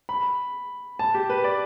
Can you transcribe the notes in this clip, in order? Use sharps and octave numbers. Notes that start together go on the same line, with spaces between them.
B5
A5
G4
B4
D5